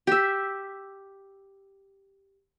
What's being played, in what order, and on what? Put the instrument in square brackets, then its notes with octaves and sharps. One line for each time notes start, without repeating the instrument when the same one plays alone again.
[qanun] G4 E5